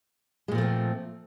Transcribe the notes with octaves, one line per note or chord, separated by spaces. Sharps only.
A#2 F3 G#3 A3 C4